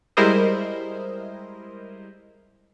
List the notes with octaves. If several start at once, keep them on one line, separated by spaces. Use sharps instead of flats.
G3 G#3 E4 A#4 C5 D#5